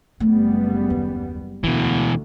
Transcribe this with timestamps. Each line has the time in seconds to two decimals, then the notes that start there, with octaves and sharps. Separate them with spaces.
0.20 F#1 G3 A3 B3 C4
0.90 D#2
1.64 D2 B2 E3 D4